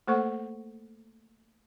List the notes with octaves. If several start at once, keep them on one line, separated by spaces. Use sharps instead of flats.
A3 A#3 A4 C5 F#5 C#6